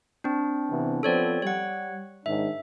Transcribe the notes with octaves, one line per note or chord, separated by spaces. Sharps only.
C4 D4
C3 E3 B3
F3 B3 C4 A4 C#5 D5
G3 C#5 F#5
G#2 D#3 D4 E5